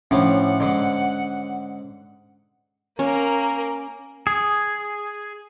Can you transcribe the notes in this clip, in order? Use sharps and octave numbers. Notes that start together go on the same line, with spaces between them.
A2 E3 F3 C#4 D4 F#5
G#2 D3
A#3 C#4 A#4
G#4